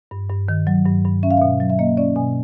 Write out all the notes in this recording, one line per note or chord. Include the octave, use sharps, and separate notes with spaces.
G2
G2
D#3
F#3
G2
G2
C#4 E5
F5
B2 E5
F#3
E5
A#3 D#5
C#4 D5
B2 G#5